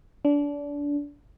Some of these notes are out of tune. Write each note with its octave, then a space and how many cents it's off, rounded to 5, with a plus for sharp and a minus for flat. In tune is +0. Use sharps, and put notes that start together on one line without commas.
D4 -25